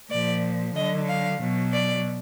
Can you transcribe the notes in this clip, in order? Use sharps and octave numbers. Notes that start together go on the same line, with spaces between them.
A#2 F3 D5
D3 F#3 D#5
F5
B2 F#3
D5